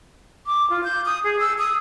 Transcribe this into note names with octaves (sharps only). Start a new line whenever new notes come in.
D6
F4
G6
D#6
G#4
E6
D#6